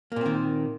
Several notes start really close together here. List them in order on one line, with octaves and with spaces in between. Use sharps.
A#3 A#2 C4 D#3